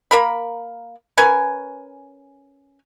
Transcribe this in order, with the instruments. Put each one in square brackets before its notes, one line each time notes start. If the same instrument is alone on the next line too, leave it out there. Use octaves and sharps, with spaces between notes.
[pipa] A#3 A#4 B5
C#4 A#4 B4 G#5